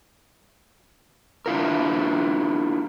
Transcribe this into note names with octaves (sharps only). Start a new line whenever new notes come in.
D4 E4 F4 A#4